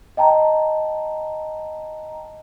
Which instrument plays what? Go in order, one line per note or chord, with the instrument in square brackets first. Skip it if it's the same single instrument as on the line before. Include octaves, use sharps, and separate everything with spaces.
[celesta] D#5 G5 A5 A#5